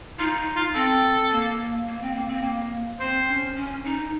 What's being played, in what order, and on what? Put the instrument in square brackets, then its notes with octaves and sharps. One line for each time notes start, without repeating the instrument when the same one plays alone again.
[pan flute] D#4 [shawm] F4
[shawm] F4
[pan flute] C4 [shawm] A4
[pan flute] A#3
A#3
C4
A#3
C4
A#3
[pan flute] C4 [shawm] C5
[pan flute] C#4
C#4
D#4